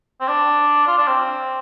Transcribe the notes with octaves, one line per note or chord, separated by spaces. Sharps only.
C4
D4
F4
D4
C4